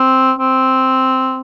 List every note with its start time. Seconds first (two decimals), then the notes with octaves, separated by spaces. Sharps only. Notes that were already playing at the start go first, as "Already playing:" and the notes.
Already playing: C4
0.39 C4